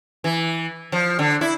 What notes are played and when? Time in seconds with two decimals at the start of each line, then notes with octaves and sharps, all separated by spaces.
0.24 E3
0.92 F3
1.19 D3
1.41 E4